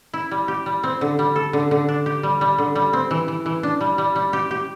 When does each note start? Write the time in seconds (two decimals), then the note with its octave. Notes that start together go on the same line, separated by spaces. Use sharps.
0.14 E4
0.31 G3
0.48 G4
0.66 G3
0.83 C4
1.01 D3
1.19 G3
1.36 A4
1.53 D3
1.71 D3
1.89 D4
2.06 G4
2.23 G3
2.41 G3
2.58 D3
2.75 G3
2.93 C4
3.11 E3
3.28 E3
3.46 E3
3.63 D4
3.81 G3
3.98 G3
4.16 G3
4.33 G4
4.51 G4